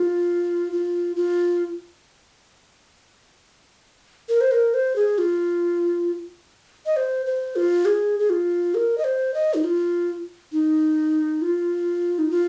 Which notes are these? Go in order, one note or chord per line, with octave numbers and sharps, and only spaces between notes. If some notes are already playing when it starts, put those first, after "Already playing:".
Already playing: F4
F4
F4
A#4
C5
A#4
C5
G#4
F4
D#5
C5
C5
F4
G#4
G#4
F4
A#4
D#5
C5
D#5
D#4
F4
D#4
F4
D#4
F4